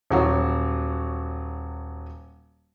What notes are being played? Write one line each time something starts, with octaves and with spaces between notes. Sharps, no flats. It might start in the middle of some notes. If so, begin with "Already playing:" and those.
D#1 F#3 F#4